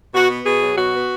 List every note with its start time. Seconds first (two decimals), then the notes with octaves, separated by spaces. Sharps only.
0.14 B2 F#4
0.29 B3
0.46 B2 G#4
0.62 F#3
0.77 B2 F#4
0.93 B3